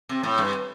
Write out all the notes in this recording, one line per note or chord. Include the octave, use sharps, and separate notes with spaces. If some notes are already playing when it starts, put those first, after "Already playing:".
C3
A2
G2